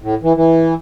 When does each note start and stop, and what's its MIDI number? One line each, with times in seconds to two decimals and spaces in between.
0.02 0.15 45
0.23 0.33 52
0.36 0.74 52